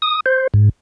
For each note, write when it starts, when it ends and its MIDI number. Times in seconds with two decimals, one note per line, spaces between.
0.02 0.20 87
0.26 0.47 72
0.54 0.69 44